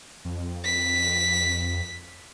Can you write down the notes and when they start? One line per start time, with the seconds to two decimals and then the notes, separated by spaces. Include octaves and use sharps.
0.25 F2
0.65 B6